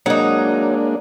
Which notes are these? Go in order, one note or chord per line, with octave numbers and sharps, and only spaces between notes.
F#3 G#3 A#3 D4 D#4